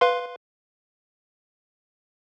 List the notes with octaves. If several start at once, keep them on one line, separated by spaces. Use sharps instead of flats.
B4 F5 C6